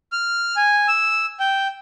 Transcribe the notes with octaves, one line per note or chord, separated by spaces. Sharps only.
F6
G#5
E6
G5